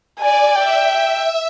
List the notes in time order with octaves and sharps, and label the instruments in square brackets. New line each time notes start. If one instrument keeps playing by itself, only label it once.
[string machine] D5 [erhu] G#5
[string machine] E5 [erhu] G5